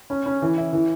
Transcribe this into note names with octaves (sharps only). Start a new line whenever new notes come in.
C#4
C#4
E3
E4
E3